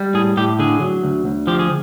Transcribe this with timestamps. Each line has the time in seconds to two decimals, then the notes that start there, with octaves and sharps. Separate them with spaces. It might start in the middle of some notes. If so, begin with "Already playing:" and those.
Already playing: G3
0.14 A2 G#4
0.37 A2 G4
0.59 D3 G#4
0.81 F#3
1.03 D2
1.25 D2
1.47 F3 G4
1.59 G#4